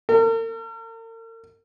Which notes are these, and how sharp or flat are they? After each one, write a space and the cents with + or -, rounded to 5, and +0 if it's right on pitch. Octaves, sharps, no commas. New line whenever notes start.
A#4 -45